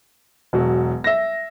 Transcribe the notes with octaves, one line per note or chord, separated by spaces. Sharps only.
E1 F#3
E5 A#6